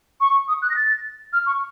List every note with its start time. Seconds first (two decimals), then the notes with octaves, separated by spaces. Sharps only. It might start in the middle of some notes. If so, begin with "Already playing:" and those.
0.21 C#6
0.48 D#6
0.62 F#6
0.70 A#6
0.76 A6
1.33 F6
1.46 C#6